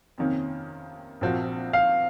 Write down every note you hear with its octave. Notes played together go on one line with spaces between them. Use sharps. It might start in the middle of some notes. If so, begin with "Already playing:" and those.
F2 C3 D#3 A#3 C#4
A#1 A#2 F3 C4 F#4
F5